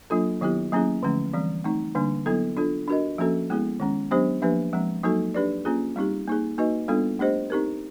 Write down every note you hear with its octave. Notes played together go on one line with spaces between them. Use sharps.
F#3 A#3 D4 F4 A4
D#3 F#3 B3 E4 G4
F#3 A#3 C#4 E4 G#4
D3 F3 A3 C#4
E3 G3 C4
A3 C4 D#4
D3 G3 A#3 D4
F#3 B3 E4 A4
D4 F4 A4
D4 F#4 A#4 D#5
F3 A#3 C#4 F#4 A4
G#3 B3 E4 G#4
D#3 G#3 C#4
F#3 B3 D4 G4 C5
F3 A#3 D4 G4 B4
F3 G#3 C4
F#3 A#3 D#4 F#4 A4
D4 G4 B4 D5
A#3 C#4 F4 G#4
G3 C4 D#4 G4
A#3 D#4 G#4
A#3 D#4 F#4 B4 D#5
G3 B3 D4 F4 A4
A3 D4 G4 C5 D#5
C4 D#4 G4 A#4